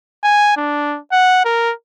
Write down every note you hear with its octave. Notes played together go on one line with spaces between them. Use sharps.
G#5
D4
F#5
A#4